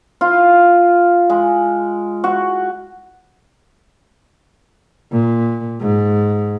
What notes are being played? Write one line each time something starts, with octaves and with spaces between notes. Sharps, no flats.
F4
G#3
F#4
A#2
G#2